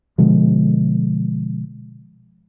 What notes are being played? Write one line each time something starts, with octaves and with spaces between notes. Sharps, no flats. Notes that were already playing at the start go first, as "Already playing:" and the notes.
B2 D3 F3 G#3